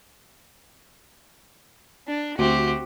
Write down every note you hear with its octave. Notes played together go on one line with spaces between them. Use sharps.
D4
D2 C4 F#4 G4